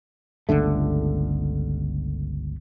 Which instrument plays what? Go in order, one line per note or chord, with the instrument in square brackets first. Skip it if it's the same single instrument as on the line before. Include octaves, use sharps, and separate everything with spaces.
[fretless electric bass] G1 C#2 D3 A3